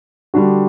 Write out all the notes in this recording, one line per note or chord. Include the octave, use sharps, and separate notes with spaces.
D3 G3 D4 F#4